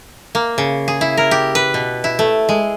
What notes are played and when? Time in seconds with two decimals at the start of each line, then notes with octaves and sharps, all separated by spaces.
0.35 A#3
0.58 C#3
0.88 G#4
1.01 E4
1.17 A#4
1.31 G4
1.55 B4
1.74 B2
2.04 E4
2.19 A3
2.49 G#3